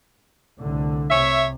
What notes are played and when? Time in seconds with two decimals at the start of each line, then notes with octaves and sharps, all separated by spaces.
0.60 C2 A2 D3
1.11 C2 C3 C#5 E5